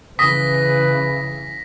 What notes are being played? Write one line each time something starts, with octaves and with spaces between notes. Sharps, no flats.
C#3 E3 B4 D#6 A#6 B6